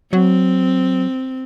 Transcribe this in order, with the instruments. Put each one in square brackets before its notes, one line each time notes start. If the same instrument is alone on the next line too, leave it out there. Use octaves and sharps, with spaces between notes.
[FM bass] F#3 [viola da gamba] C4